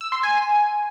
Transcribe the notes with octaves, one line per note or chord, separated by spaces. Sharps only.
E6
C6
G#5